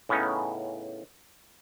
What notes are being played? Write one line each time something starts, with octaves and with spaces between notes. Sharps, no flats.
A2 C#3 B3 C#4 D#4